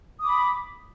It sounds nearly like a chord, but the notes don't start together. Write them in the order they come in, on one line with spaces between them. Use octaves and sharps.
D#6 D6 B5